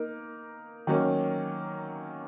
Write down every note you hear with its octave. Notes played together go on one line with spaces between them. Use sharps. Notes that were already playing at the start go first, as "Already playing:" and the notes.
Already playing: A#3 D#4 A#4
D#3 F#3 A#3 C#4